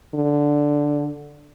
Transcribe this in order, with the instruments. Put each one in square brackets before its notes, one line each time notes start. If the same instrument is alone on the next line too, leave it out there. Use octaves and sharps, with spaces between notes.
[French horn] D3